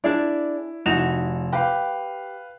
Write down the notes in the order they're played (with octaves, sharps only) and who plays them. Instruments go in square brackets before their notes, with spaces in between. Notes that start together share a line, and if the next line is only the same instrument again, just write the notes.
[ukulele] D4 G#4 D5 [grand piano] E4
[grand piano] F1 E7 F7 [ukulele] D#4 E4 F#4
[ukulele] G4 [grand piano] B4 F5